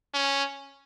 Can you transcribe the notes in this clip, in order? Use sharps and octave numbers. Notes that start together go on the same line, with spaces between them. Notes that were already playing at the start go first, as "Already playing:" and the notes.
C#4